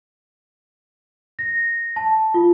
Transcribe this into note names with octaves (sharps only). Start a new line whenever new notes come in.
A#6
A5
F4